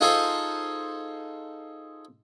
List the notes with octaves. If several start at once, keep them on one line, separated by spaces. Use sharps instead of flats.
D#4 F4 G#4 A4 C5